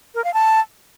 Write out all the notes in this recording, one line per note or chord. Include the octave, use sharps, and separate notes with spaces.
A#4
F5
A5